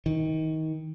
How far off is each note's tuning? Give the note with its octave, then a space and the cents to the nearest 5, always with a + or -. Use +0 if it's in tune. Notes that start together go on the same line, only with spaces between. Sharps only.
D#3 +25